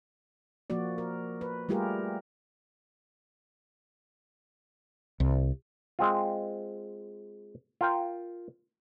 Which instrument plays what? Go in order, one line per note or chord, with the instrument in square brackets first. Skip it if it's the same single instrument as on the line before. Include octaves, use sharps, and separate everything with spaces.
[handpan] F3 A#3 F#4 D5
A#4
B4
G3 A3 F4 G4 G#4 A#4
[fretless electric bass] C2
[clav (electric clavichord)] G#3 C4 F4
F4 A#4 G5